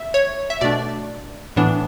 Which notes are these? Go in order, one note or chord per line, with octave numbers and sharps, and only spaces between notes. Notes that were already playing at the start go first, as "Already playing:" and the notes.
Already playing: E5
C#5
E5
B2 A3 D4 D5
A2 E3 B3 D4